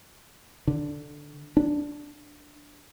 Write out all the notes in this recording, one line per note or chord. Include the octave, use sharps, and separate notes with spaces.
D3
D4